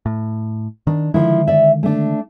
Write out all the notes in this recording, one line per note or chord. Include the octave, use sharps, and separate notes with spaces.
A2
D#3 D4
D3 D#3 F3 G#3 E4
D5 E5
A3 D4